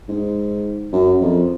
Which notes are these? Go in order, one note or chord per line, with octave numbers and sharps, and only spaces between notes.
G#2
F#2
F2